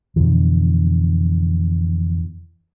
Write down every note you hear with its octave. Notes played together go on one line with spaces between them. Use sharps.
F2 B2 D3 E3